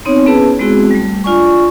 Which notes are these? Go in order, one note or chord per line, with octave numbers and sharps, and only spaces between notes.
B3 C4 D#4 C#5
B3 C#4 E4 G#4 B4 A5
G#3 B3 C4 E4 F#4 G#4
G3 A3
D4 F4 D5 G#5 C#6